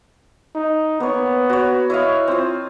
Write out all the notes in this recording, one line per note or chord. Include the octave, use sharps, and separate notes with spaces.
D#4
A#3 B3 C#5
F#4 C#5
E4 C#5 D#5 F5
C4 F4